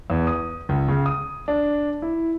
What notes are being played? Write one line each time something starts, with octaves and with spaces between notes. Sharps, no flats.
E2
D#6
C#2
C#3
D#6
D4
E4